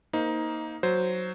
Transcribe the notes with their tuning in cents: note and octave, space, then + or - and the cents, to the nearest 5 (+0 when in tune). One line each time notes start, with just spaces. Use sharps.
A#3 +0 D#4 +15 C5 -5
F#3 +0 C5 -5